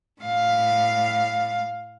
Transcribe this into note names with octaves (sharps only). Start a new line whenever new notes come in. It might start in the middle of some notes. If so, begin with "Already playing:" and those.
A2 F5